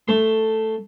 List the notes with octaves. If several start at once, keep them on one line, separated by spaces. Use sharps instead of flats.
A3 C6